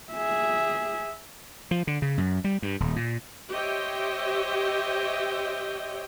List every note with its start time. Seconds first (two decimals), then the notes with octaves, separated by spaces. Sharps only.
0.13 G#4 E5
1.71 F3
1.87 D3
2.02 C#3
2.18 F#2
2.44 G3
2.62 G2
2.80 D#1
2.96 A#2
3.51 G4 C5 C#5 D#5 E5 G5